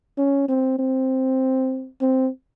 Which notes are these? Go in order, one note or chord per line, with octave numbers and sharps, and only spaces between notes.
C#4
C4
C4
C4